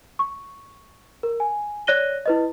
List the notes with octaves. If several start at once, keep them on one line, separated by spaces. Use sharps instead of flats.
C#6
A#4
G#5
C#5 D5 F#6 A#6 D#7 G7
E4 B4 D#5